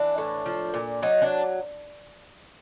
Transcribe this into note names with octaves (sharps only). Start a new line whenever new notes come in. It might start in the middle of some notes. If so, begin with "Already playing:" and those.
Already playing: E3 D4
A2
F3
A#2
F#3 D#4
D4